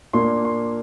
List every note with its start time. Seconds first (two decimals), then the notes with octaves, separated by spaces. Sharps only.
0.13 A#2 A#3 D4 F4 C6
0.45 C6